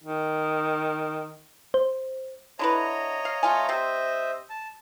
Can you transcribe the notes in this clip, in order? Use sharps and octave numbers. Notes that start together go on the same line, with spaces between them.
D#3
C5
D3 E4 B4 C#5 D#5 A#5
F5
A3 F4 G#5
C3 C5 D#5 E5
A5